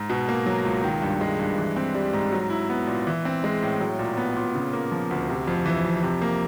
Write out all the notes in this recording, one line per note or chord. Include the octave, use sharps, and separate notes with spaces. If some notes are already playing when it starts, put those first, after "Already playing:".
Already playing: G#2
B2
A#3
F#3
C#2
D#3
G2
G#3
G2
E3
C4
G3
G#2
F#3
E4
B3
A#2
E3
C4
G#3
A2
F#3
A#2
B3
A#2
C#3
A#3
F3
D2
C3
F2
E3
F2
C3
A#3